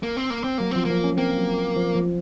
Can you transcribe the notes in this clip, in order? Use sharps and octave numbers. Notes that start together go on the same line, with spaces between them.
A#3
C4
A#3
C4
F#3 A#3
F3 C4
F3 A#3
C#4
A#3 C4
F#3
F3
F3